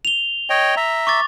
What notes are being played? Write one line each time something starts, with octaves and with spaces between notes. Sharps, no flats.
F7 G7
C#5 D#5 G5
E5 A#5
C#6 D6 A6